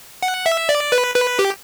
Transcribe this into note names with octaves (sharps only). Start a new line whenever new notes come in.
F#5
E5
D5
B4
B4
G4